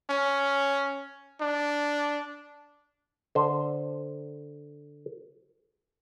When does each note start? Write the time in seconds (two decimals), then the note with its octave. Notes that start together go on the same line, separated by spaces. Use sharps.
0.10 C#4
1.41 D4
3.35 D3 C5